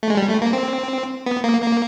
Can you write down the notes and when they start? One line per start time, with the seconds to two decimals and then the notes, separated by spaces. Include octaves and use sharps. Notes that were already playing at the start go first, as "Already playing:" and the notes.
0.03 A3
0.10 G#3
0.17 G3
0.29 A3
0.42 A#3
0.53 C4
1.26 B3
1.44 A#3
1.62 A#3